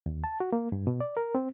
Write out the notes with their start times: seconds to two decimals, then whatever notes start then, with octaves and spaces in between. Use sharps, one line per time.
0.06 D#2
0.24 A5
0.40 F#4
0.53 A#3
0.72 G2
0.87 B2
1.01 D5
1.17 A#4
1.35 C4